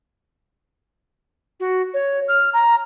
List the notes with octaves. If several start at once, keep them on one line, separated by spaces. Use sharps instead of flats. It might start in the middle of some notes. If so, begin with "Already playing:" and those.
F#4
C#5
F6
A#5